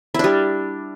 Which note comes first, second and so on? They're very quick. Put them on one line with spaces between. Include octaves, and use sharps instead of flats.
E4 D4 G3